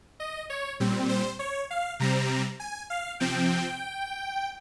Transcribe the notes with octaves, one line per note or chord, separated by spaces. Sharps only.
D#5
C#5
A#2 G3 C4
C5
C#5
F5
C3 G3 C4 A#5
G#5
F5
C3 F3 C4 G5